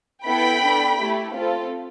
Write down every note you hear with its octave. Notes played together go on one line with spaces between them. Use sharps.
B3 E4 A4 G5 B5
D4 A4
A3 E4 G4
C4 F4 A4